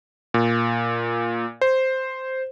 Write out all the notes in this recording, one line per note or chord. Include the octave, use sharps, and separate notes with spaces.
A#2
C5